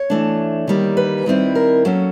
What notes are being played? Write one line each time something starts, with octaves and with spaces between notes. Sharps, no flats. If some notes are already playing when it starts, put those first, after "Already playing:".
Already playing: C#5
E3 A3 D4
D#3 G3 A#3
B4
D#3 G3 C4 E4
A#4
F#3 A#3 C#4 A4